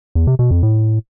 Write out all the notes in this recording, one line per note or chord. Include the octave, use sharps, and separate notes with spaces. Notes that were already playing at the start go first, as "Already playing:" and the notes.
E2
C3
B2
F2
A2